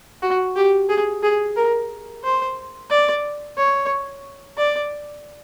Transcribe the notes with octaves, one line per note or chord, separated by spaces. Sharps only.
F#4
G4
G#4
G#4
A#4
C5
D5
C#5
D5